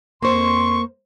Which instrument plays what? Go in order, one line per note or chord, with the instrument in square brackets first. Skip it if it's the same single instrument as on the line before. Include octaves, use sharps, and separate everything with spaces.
[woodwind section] F2 C6 [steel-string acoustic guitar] A#3 C5 [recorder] C#6